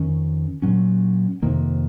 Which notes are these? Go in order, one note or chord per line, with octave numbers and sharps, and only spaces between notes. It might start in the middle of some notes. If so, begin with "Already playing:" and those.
Already playing: F2 D#3 C#4
A#2 F#3 C#4
F2 C3 D#3 A#3